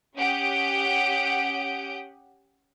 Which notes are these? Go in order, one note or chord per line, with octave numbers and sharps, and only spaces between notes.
C#4 G4 F#5 D#6 G6 D7